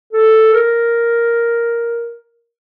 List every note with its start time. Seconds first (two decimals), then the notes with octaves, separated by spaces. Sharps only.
0.13 A4
0.54 A#4